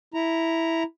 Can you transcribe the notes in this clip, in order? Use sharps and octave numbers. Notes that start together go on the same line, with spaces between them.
E4 A#5